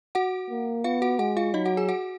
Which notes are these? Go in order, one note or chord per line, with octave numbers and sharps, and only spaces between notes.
F#4 F#5
A#3
B3 F4 F5
F#4 F#5
G#3 F#4 F#5
F4 F5
F#3 D#4 D#5
F#4 F#5
G#4 G#5
F#4 F#5